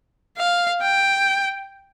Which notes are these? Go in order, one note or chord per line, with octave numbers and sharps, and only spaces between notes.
F5
G5